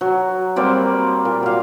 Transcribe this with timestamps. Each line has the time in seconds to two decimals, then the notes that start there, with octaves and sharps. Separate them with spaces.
0.01 F#3
0.56 G3 A#3 C4 D5
1.25 A#2
1.43 F#3 F5